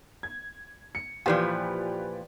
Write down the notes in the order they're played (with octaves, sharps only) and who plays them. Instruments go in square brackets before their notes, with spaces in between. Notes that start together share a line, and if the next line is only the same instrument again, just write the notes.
[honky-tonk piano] G#6
C#7
[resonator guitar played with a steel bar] A#2 E3 F3 [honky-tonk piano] G4 B4 D5